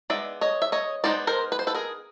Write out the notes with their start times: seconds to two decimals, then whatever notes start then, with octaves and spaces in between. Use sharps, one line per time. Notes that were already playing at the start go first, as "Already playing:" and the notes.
0.10 G#3 B3 D#4 D5 E5
0.41 C#5 D#5
0.62 E5
0.72 C#5 D#5
1.04 G#3 B3 D#4 C5 D5
1.27 A#4 C5
1.52 B4
1.59 C5
1.67 A4 B4
1.75 G#4 A#4